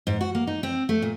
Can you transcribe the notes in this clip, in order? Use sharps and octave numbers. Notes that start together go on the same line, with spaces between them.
G#2
F#4
A#3
D#4
C4
A3
A#2